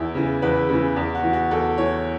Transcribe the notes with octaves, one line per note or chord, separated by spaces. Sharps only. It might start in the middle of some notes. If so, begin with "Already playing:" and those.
Already playing: E2 E4
C#3 E3
E2 B4
C#3 E3
E2
F#4
E3
F#4
E2 A4
E3 C#5